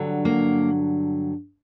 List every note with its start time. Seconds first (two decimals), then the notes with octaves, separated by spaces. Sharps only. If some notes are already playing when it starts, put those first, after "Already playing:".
Already playing: G2 D3 F#3
0.25 A#3